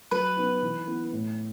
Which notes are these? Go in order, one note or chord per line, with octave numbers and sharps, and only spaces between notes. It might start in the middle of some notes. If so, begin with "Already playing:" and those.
F#3 B4
B3 D#4
E3
B3 E4
A2